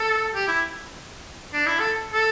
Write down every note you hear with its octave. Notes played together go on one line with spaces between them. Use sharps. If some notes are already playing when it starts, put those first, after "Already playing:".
Already playing: A4
G4
E4
D4
E4
A4
A4